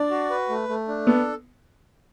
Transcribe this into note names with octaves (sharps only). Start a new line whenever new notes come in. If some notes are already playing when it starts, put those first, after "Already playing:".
Already playing: D4 D5
F#4
B4
A3
A3
D4
B3 A4